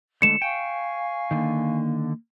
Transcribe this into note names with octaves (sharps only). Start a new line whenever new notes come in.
D3 G#3 A3 C#7 E7
F5 G5 G#5 C#6
D3 D#3 A#3